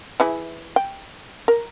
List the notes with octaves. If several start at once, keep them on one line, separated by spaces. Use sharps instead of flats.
E3 E4 G#4
G5
A#4